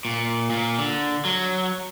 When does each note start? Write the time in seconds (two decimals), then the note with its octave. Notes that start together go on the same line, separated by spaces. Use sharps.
0.05 A#2
0.50 A#2
0.78 D3
1.25 F#3